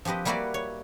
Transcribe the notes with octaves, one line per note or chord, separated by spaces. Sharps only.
F3 C4 G4 B4 D#5
G3 A#3 E4 F#4 B4 D5
C#5